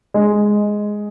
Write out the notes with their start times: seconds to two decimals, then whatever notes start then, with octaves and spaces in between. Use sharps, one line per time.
0.14 G#3